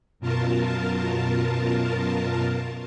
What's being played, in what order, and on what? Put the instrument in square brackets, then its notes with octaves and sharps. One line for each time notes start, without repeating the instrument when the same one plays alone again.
[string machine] F#2 B2 F4 A#4 A5